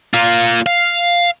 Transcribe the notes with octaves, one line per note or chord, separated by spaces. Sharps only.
A#3 F4
F5